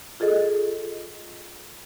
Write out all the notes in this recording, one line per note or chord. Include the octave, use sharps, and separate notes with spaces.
F4 G#4 A4 D#5